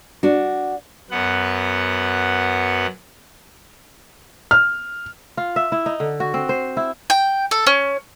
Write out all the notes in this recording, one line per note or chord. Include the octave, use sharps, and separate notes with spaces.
D4 F#4
F#2 B3 F#5
F6
F4
E5
E4
D#4
D3
F#4
C4
C5
E4
G5
A4
C#4